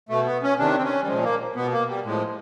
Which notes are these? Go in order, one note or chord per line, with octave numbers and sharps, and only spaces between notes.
B2 A3
B3
C#4
C3 D#3 D4
C4
C#4
G3
A#2 F3 G#3
A#3
B2 B3
A#3
G3
A2 F3 G#3